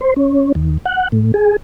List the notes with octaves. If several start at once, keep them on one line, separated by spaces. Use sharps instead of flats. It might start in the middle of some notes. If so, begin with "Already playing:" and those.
C5
C#4
D#2
F#5
A2
G#4